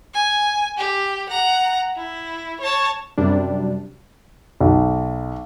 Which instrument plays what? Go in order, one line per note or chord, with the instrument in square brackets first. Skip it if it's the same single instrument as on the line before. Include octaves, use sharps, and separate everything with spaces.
[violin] G#5
G4
F#5 A#5
E4
C#5 A5
[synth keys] F#2 C3 G3 D4
[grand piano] B1